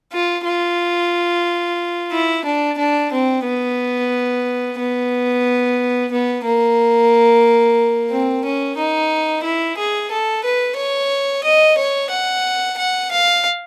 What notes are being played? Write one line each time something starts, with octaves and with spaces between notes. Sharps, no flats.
F4
F4
E4
D4
D4
C4
B3
B3
B3
A#3
C4
C#4
D#4
E4
G#4
A4
B4
C#5
D#5
C#5
F#5
F#5
F5